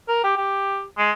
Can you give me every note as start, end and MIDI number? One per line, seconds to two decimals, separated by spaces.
0.08 0.23 70
0.24 0.34 67
0.37 0.83 67
0.98 1.11 56